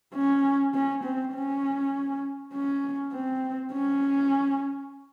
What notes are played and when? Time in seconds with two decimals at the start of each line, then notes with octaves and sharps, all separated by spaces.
0.14 C#4
0.74 C#4
1.04 C4
1.33 C#4
2.53 C#4
3.13 C4
3.72 C#4